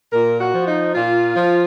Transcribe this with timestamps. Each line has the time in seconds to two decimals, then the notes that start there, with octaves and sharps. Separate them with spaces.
0.13 A#2 A#4
0.40 F#4
0.54 F3
0.68 D#4
0.94 A#2 F4
1.36 F3